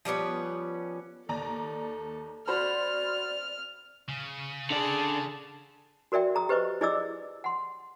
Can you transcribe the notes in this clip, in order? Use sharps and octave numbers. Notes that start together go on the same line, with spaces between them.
F3 G3 B3 C#4
D#2 A4 D5 A#5
F#4 C5 D5 B5 F6
C#3
D3 G#4 D5 A5
F#4 A#4 D5 E5 G5
G#4 A#5 D#6
G4 B4 C5 D#5 C#6
E4 G#4 D5 D#5 D6 E6
F#5 C6